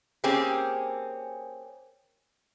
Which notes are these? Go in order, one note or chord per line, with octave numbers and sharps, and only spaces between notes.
A#3 C4 C#4 G4 G#4